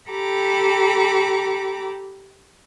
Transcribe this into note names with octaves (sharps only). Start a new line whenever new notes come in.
G4 A4 A#5 B5 D6